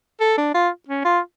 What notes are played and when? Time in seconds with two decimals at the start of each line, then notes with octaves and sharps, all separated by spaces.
0.20 A4
0.38 D4
0.54 F4
0.89 C#4
1.05 F4